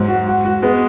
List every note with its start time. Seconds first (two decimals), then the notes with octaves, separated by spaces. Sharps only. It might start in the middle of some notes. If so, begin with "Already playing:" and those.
Already playing: G#2 F#3
0.08 F#4
0.27 F#4
0.45 F#4
0.62 G#3 B3